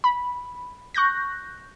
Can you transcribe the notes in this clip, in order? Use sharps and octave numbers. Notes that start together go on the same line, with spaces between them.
B5
C#6 F#6 G6 A#6